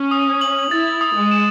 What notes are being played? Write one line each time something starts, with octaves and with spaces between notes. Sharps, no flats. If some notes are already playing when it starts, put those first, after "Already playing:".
Already playing: C#4
D#6
F#7
E4 A6
D#6
G#3
E7